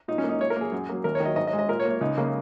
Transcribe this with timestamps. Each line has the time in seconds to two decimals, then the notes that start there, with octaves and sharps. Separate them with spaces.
0.08 A#2 D#4
0.18 C#4
0.24 A#3
0.29 D#4
0.40 A#2 C#5
0.50 A#4
0.56 A#3 G#4
0.72 F#2
0.89 F#3 A#3
1.04 D#2 A#4
1.15 C#5
1.20 D#3
1.25 F#3 D#5
1.36 G#2 D#5
1.47 D#5
1.53 G#3
1.59 D#5
1.69 A#2 A#4
1.80 C#5
1.85 A#3
1.90 C#5
2.01 C#2 D#4
2.17 C#3 A#3